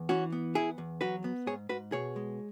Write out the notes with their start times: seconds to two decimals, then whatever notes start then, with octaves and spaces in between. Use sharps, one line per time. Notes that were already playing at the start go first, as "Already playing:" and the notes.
Already playing: E2
0.09 E3 C#4 F#4
0.32 B3
0.55 E2 E4 G#4
0.78 E2
1.01 F#3 F#4 B4
1.24 B3
1.46 G#2 G#4 C#5
1.69 G#2 F#4 B4
1.92 B2 G#4 C#5
2.16 G#3